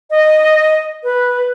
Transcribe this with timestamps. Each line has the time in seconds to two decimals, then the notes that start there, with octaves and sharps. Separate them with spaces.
0.11 D#5
1.04 B4